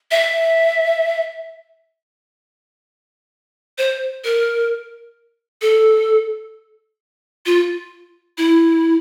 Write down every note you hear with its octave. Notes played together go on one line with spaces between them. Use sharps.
E5
C5
A#4
A4
F4
E4